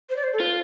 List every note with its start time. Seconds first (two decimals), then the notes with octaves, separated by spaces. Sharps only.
0.10 C5
0.16 D5
0.23 C5
0.33 A4
0.40 F4 B4